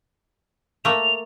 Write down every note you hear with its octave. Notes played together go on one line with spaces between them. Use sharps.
A3 A#3 F7